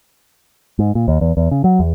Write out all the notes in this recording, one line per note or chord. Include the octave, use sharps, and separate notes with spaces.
G#2
A#2
D#2
E2
E2
C#3
F#3
E2